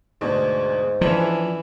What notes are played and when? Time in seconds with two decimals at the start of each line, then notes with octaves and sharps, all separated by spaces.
0.21 D2 G#2 B2 D4
1.01 E3 F3 C#4 D4 A4